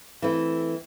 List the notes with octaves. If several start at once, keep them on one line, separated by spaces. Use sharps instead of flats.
E3 A3 C4 E4